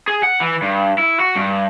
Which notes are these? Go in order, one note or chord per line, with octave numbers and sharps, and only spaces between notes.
G#4
F#5
E3
G2
E4
F#4
G2